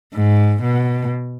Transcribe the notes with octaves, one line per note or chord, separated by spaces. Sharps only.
G#2
B2